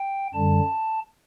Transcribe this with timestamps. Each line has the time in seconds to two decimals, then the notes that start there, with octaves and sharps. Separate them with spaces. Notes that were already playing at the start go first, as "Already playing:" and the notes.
Already playing: G5
0.34 F#2 D3 G3 A5